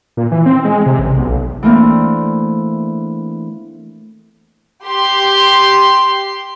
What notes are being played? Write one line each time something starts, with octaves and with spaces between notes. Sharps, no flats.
A#2
E3
C4
G#3
C3
A1
B1
E3 A3 A#3 C4 D4
G4 C6